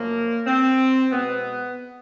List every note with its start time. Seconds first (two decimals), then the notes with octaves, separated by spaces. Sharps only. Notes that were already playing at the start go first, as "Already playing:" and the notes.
Already playing: F#2 C#3 F3 A#3
0.46 C4
1.12 B2 G#3 B3